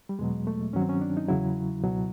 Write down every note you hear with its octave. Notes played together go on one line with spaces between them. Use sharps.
G3
E2 B2 F#3 G#3
A3
G2 D#3 F#3 C#4
C4
C#4
D4
D#4
E2 C#3 F#3 E4
C#2 B2 F#3